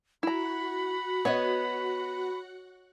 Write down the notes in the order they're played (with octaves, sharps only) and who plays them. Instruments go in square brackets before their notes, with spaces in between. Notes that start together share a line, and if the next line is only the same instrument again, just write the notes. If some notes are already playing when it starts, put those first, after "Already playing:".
[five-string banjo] E4 A#5 [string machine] F#4 F#5 [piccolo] B5
[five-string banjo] B3 [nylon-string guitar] C#5 D#5